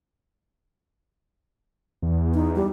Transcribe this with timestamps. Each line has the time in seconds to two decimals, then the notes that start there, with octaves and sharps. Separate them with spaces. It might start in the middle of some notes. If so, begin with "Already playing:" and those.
2.02 E2
2.34 D#4
2.55 G3